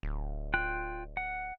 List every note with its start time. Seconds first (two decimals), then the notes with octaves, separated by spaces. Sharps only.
0.03 D1
0.54 F4 G5 F#6
1.17 F#5